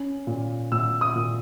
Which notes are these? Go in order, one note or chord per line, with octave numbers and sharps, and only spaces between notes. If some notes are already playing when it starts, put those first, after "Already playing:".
Already playing: C#4
A#2
A#2 E6
D#6
A#2